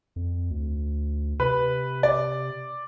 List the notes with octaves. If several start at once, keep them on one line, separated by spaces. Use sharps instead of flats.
F2
D2
C3 B4
D5